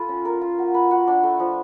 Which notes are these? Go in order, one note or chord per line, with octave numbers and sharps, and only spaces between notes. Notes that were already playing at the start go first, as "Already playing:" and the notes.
Already playing: F4 A4 B4
C#4
A#4
F4
F#4
B4
F#4
D4
A3
F3